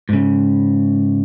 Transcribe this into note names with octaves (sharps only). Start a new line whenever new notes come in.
G#2 C#3